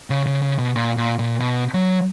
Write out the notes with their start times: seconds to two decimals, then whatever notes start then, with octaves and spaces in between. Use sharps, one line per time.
0.10 C#3
0.26 C#3
0.42 C#3
0.58 B2
0.76 A#2
0.97 A#2
1.19 A#2
1.40 B2
1.74 F#3